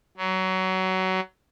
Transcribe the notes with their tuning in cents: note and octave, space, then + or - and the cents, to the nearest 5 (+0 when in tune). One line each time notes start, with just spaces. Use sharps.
F#3 +20